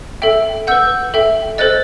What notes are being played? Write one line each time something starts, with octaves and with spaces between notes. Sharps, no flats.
A4 E5 G5
B4 F#5 E6 G6
A4 E5 G5
A4 C5 D#5 F#6 A6